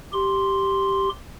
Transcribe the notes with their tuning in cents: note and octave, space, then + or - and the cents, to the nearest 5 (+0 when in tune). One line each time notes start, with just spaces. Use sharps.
G4 -5 C6 +0